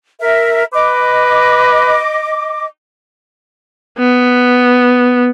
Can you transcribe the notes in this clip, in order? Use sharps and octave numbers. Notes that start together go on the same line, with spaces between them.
A#4 E5
B4 D#5 D6
B3